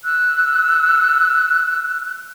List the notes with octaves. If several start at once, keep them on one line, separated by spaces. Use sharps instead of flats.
E6 F#6